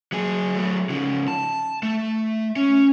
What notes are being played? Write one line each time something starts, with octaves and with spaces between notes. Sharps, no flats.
F#3 G#4
F#3 A3
C#3 F3
A5
A3
C#4